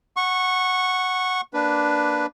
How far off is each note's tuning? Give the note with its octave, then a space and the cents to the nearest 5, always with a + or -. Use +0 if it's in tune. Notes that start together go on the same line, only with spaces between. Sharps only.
F#5 +0 C#6 -15
A#3 +5 D4 +0 B4 +0